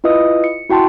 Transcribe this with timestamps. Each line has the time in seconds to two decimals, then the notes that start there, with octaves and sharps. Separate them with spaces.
0.04 E4 F4 B4 D#5 D#6 E6
0.44 C#7
0.69 E4 F#4 G5 A5 C6